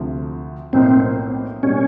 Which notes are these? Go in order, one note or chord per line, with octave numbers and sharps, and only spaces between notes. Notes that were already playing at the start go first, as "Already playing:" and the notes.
Already playing: D2 C3 F3
B1 A2 F3 A#3 C4 D#4
B2 G3 A#3 C#4 D4